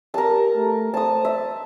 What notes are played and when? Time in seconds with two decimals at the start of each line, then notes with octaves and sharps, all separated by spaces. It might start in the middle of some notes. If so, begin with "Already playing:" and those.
0.14 G4 A#4 A5
0.56 A3
0.94 C5 A5 D#6
1.25 E5